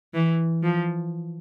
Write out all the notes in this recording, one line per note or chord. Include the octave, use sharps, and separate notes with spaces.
E3
F3